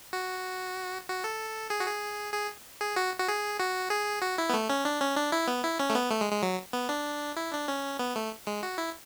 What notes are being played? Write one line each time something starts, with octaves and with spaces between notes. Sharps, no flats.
F#4
F#4
A4
G#4
F#4
G#4
G#4
G#4
F#4
F#4
G#4
F#4
G#4
F#4
E4
B3
A3
C#4
D4
C#4
D4
E4
B3
E4
C#4
A3
B3
A3
G#3
G#3
F#3
B3
D4
E4
D4
C#4
B3
A3
G#3
F#4
E4